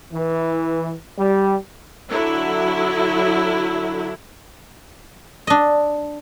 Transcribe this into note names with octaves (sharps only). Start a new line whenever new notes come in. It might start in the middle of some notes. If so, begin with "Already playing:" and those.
E3
G3
D3 F#3 E4
D4 D#5